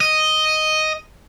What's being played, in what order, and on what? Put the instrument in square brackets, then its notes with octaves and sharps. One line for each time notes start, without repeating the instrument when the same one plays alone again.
[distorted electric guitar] D#5